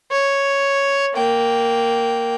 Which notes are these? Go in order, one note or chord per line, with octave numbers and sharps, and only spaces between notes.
C#5
A#3 G5